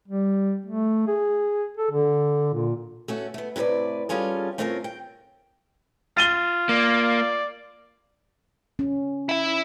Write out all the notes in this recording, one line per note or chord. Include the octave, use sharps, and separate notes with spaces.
G3
A3
G#4
A4
D3
A#2
A3 C#4 F#4
A3 B3
A2 C3 A4 B4 D5
G3 C#4 F4 G#4 A4
A3 C4 C#4 F4 A4 A#4
G5
F4 A6 D#7 G7
A#3 D5
C#4
E4 E5